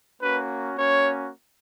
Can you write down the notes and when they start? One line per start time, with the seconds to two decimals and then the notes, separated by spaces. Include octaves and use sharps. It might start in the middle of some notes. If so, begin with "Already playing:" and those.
0.20 A#3 C#4 F#4 B4
0.77 A#3 C#4 F#4 C#5